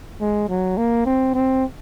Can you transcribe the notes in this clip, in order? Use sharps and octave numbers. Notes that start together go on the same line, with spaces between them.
G#3
F#3
A#3
C4
C4